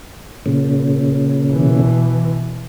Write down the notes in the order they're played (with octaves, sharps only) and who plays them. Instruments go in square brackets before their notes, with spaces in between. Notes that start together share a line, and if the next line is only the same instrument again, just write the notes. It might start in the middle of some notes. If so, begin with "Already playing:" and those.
[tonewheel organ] A#2 C#3
[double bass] B2 E3